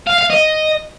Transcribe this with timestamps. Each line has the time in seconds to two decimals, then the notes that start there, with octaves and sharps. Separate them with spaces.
0.07 F5
0.19 F5
0.30 D#5